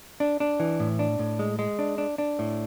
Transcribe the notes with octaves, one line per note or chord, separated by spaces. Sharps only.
D4
D4
E3
A2
D4
A2
G#3
G#3
D4
D4
D4
A2